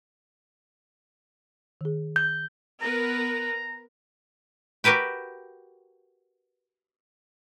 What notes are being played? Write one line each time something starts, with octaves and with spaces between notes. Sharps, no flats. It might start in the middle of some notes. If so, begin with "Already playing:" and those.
D#3 G#4
G6
B3 A#4 B4 A#5
F#4 G4 A#4 B4 G5